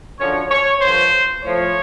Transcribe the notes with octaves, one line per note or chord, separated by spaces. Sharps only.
F#2 D3 F3 C#5
C#5
G2 D3 F3 C5
A2 F3 C#5